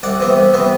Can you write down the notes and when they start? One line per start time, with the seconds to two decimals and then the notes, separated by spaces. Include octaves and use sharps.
0.03 C2 D5 F#5
0.20 C3 E3 B3
0.37 C2
0.54 C3 E3 B3